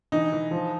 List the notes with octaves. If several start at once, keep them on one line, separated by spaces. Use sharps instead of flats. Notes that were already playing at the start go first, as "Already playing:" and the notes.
E3 D#4
E3
F3